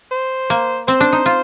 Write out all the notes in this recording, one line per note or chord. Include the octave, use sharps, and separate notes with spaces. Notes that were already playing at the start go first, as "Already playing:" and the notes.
C5
A#3
C4 C5
D4
D#4
F4